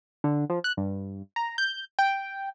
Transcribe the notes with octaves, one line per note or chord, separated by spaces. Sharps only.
D3
F3
F#6
G2
A#5
G6
G5